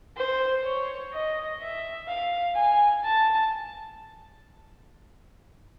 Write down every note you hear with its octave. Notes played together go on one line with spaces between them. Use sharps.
C5
C#5
D#5
E5
F5
G#5
A5